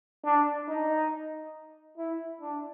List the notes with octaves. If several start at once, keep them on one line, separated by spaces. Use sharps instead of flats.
D4
D#4
E4
D4